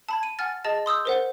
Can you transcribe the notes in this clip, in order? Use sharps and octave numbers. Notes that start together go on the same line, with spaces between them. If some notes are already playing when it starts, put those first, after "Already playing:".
A5 B5 G#6
D#7
F#5 G#5 F6 A6
G#4 D#5 A5 A6
C6 D#6 E6 G6
A#4 C5 F#5